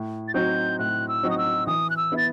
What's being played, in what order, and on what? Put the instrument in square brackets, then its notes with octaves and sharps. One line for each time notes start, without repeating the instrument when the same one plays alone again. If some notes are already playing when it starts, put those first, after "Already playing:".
Already playing: [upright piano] A2
[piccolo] A6
[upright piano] F#3 C4 D#4 F#4 [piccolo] G6
[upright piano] A2 [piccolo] F#6
[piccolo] E6
[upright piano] F#3 C4 D#4 F#4
[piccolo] D#6
E6
[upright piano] E3 [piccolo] D#6
[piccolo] F#6
E6
[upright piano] B3 E4
[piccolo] A6